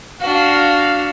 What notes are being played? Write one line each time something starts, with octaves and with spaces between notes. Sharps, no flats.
D4 F#4 F5